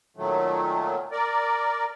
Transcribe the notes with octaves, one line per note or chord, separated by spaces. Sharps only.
A#2 D#3 F#3 A3
A#4 D5